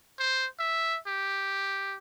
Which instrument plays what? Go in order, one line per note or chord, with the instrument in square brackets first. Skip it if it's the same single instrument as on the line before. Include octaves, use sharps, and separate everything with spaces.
[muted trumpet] C5
E5
G4